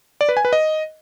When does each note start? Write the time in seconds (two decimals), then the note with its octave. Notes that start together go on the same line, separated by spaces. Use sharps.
0.21 D5
0.29 B4
0.37 G#5
0.45 B4
0.53 D#5